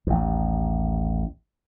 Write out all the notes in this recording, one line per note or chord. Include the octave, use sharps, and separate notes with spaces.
A1 D#2